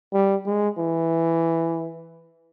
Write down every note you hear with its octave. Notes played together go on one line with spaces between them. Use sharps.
G3
G#3
E3